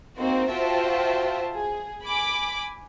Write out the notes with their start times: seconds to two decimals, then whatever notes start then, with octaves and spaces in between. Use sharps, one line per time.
0.17 A#3 C4 D#4 F#4 C5
0.49 F4 F#4 C5 E5 G5 A5
1.53 G#4
2.03 G#5 B5 D6